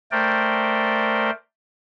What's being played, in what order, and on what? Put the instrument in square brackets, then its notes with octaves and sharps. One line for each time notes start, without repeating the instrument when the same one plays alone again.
[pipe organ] A3 A#4 C5 D5 G5